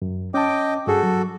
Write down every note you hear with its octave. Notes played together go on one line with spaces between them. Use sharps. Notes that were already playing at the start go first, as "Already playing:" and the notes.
F#2
C#4 D#5 G5 A5 D6
G2 F#4 G#4 A4
F#3